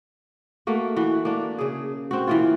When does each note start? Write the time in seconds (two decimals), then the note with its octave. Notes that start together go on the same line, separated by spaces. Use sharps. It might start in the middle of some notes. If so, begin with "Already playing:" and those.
0.67 A3 A#3 F#4
0.96 E3 F#4
1.25 A#3 D4
1.58 C#3 G#4
2.11 C4 F#4
2.27 E3 A#3 F4